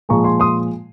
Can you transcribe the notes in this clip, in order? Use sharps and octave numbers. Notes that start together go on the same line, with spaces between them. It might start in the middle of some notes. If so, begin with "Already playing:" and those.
A#2 F3 G#3 A#5 C#6
G#5 C6
C6 D#6